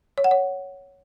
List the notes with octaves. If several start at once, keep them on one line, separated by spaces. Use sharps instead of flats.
C#5
F#5
C#5